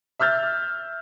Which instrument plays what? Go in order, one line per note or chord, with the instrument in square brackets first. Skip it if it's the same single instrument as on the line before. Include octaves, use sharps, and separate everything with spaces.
[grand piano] E5 E6 F6 G6 A6